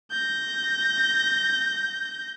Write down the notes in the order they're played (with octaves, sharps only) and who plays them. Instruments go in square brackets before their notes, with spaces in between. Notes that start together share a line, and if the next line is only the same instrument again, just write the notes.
[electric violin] G6 A#6